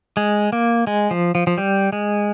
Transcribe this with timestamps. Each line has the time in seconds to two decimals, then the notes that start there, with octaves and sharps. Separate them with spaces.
0.17 G#3
0.53 A#3
0.87 G#3
1.11 F3
1.35 F3
1.47 F3
1.58 G3
1.93 G#3